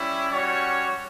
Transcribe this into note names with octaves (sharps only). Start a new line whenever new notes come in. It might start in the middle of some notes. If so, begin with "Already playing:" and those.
Already playing: G3 C#4 E4
G3 C#4 F#4 C#5